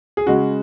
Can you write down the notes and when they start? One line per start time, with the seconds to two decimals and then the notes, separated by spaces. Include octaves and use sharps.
0.17 G#4
0.27 C#3 G#3 F#4